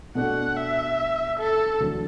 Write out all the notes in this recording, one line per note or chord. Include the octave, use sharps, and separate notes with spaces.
B2 A3 D4 F#4 F#5
E5
A4
E1 D2 D3 F#3 D4